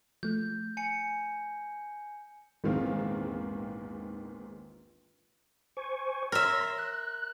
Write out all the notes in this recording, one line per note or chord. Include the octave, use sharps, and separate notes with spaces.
F3 A3 G6
G#5 C#7
A#1 E2 G#2 D#3 C4 F5
C5 G#5 C#6
A#4 C#5 E5 C6 A#6
F#6